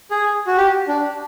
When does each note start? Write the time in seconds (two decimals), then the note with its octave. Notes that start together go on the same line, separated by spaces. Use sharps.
0.11 G#4
0.47 F#4
0.57 G4
0.88 D4